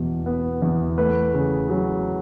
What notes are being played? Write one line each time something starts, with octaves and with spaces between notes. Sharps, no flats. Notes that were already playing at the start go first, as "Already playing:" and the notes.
Already playing: E2 B2
B3
E2
A3 B4
C#3
F#3